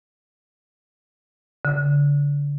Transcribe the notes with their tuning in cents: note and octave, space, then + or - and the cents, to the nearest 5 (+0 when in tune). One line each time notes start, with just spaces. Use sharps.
D3 -35